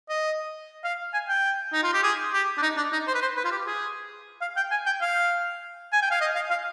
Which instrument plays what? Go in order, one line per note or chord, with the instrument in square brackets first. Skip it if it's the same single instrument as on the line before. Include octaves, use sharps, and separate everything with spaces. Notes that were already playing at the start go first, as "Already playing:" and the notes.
[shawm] D#5
F5
G#5
G5
D#4
F4
G4
G#4
G4
D4
D#4
D4
D#4
C5
B4
C5
B4
F4
G4
G#4
F5
G5
G#5
G5
F5
G#5
G5
F5
D#5
F5
F5